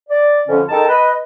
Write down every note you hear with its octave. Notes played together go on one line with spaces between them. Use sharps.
D5
F2 D3 C#4
G#3 D#4 A4 A#4 G5 A5
B4 D#5